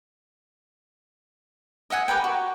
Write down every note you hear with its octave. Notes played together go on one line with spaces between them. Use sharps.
D#5 E5 F#5 G#5
G4 A#4 B4 G5
F#4